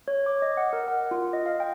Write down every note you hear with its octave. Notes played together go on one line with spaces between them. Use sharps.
C#5
D6
D#5
F#5
A#4
F#5
F4
D#5
F5
G5